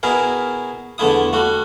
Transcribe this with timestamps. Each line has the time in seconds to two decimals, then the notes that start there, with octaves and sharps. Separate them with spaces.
0.03 B2 E4 G#4 A#4
0.98 E2 D3 A3 E4 D#6
1.33 G3 A3 F#4